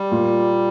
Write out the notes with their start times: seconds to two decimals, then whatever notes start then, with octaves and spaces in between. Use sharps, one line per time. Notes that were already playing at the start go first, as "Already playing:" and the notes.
Already playing: G3
0.12 A#2